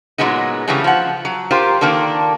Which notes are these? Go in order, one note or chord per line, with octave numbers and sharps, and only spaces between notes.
A#2 F#3 G#3 B3 D#4
C#3 E3 F#3 G3 A3 C#4
F3 F#5
F#3
F4 G4 A#4 C5
D#3 A#3 D4 A4